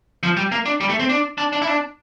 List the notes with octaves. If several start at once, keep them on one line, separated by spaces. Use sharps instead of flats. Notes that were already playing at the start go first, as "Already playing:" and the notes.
F3
G3
A#3
D4
G3
A3
C4
D4
D4
D4
E4
D4